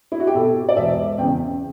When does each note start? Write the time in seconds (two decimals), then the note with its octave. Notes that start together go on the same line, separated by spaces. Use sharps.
0.12 E4
0.20 F#4
0.27 G4
0.35 B2 A4
0.69 D5
0.76 E1 E5
1.18 E2 C#3 G5